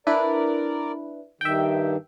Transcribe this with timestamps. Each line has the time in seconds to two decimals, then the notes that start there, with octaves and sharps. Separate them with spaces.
0.07 D4 E4 A#4 B4 D5
1.41 G2 D#3 E5 G5